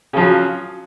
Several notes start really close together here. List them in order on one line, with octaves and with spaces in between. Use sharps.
C#3 F3 F#3